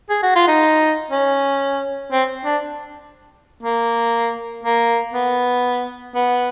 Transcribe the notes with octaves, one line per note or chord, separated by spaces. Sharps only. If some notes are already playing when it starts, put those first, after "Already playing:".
G#4
F#4
F4
D#4
C#4
C4
D4
A#3
A#3
B3
B3